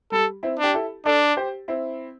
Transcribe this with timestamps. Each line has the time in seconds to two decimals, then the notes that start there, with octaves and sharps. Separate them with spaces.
0.12 G3 A4
0.43 C4 E4
0.59 D4 G4
0.74 E4 A4
1.05 D4 A4 D5
1.37 G4 C5
1.68 C4 E4